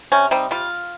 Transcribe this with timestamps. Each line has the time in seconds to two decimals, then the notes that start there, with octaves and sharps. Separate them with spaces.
0.12 C3 C#4
0.31 G3 C4 D#4
0.51 G3 F4